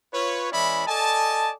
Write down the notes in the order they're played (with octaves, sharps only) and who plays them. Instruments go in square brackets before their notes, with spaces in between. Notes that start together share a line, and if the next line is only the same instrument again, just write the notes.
[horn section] F4 B4 C#5
E3 G#3 C#4 E4 D5 B5
A4 D5 D#5 G#5 A5